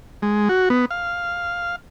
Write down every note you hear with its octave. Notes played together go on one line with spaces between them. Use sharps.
G#3
F#4
B3
F5